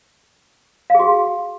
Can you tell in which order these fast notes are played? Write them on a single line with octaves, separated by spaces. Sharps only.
F5 G#4 F#4